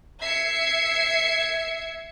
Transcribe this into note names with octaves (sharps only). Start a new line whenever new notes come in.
E5 G#6 C7 C#7